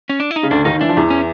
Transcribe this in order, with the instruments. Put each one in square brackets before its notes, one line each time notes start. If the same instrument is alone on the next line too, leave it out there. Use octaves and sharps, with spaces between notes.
[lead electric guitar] C#4
D4
E4
D#4
[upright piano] C#3
[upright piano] D2 D3 [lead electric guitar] D4
[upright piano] D#2 D#3 [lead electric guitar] D#4
[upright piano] E3 [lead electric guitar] D4
[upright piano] F3
E2 E3
[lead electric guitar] C#4